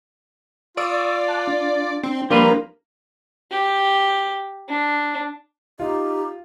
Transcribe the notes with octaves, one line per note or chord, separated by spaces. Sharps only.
F4 D5 C#6 D#6 E6
A5 D6 F#6
D4
C4
F3 G3 A#3 D4 F4 A#4 B4
G4
D4
D#4 F4 G4